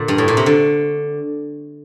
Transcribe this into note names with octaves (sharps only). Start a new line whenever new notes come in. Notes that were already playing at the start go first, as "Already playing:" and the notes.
Already playing: A#2 D3
G2
A2
A#2
C3
D3